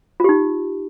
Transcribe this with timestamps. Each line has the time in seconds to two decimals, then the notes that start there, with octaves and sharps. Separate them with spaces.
0.20 F4
0.24 G4
0.29 D#4